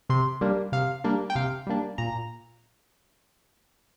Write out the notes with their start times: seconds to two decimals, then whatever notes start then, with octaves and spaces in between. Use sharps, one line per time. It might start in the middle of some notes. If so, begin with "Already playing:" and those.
0.10 C3 C6
0.41 G3 A#3 D4
0.72 C3 F5
1.04 G3 A#3 D4
1.30 G5
1.35 C3 F5
1.67 G3 A#3 D4
1.98 A#2 A#5